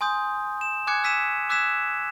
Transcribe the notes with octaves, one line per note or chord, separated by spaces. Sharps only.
G#5 C6 D#6 G6
E7
G#5 D6 F#6 G#6 C#7
E6 B6 D#7 E7
D6 E6 F#6 G#6 B6 E7